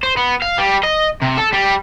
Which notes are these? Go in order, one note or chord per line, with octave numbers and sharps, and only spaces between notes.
C5
B3
F5
G3
D#5
C3
A4
G3